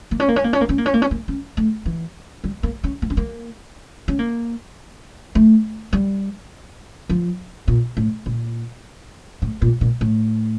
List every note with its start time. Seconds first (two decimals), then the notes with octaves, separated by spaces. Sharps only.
0.11 A#3
0.20 C#4
0.28 A#3
0.36 C#4
0.44 A#3
0.53 C#4
0.61 A#3
0.69 C#4
0.78 A#3
0.86 C#4
0.94 A#3
1.02 C#4
1.11 A#3
1.28 C#4
1.57 A3
1.86 E3
2.44 G3
2.63 A#3
2.84 C#4
3.02 A#3
3.10 C#4
3.17 A#3
4.08 C#4
4.19 A#3
5.35 A3
5.93 G3
7.09 F3
7.68 A#2
7.97 A2
8.26 A#2
9.42 A2
9.62 A#2
9.81 A#2
10.01 A2